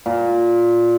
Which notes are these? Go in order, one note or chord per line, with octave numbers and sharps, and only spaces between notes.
A#2